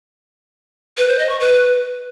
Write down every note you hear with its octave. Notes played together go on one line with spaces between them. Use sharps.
B4
C5
D#5
C#6
B4